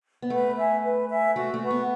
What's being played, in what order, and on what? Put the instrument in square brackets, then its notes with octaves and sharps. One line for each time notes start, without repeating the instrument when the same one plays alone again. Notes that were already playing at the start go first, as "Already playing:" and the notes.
[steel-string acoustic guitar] B3
[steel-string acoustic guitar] A3 [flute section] B4
[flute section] E5 G#5
B4
E5 G#5
[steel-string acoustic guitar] A3 [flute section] F#4
[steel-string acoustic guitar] A3
[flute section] B4 F#5 C#6
[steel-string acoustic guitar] B3